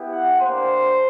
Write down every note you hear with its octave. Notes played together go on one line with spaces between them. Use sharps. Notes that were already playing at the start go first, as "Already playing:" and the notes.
Already playing: B3 E4 G4
F#5
A#3 D4 G4 C5